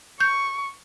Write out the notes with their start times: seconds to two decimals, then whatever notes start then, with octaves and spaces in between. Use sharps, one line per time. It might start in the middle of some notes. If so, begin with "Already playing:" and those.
0.20 C#6 G6